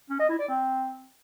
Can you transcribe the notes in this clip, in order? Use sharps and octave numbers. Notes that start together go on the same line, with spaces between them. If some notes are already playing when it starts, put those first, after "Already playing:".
C#4
D#5
E4
D5
C4